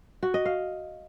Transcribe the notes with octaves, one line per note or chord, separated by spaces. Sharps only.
F#4
D#5
F5